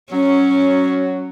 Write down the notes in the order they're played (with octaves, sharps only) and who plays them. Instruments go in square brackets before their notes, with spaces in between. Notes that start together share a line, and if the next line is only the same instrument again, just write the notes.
[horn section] F#3 [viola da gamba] C#4